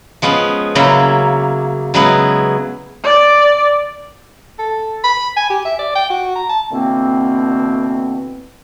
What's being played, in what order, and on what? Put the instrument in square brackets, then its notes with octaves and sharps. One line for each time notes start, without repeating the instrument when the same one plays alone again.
[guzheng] F3 G#3 B3 C#4
C#3 F#3 A#3 C#4 E4
C#3 F#3 G#3 B3 E4
[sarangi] D5
[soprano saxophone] A4
B5
G#5
G4
E5
D5
G5
F#4
A#5
A5
[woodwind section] B2 D3 E3 A#3 C4